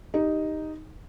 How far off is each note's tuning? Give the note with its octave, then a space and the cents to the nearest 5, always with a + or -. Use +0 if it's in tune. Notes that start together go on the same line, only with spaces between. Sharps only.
D#4 +0 G4 +0